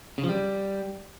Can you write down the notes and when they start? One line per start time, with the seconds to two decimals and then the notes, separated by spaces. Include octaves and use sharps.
0.18 C#3
0.23 F3
0.29 G3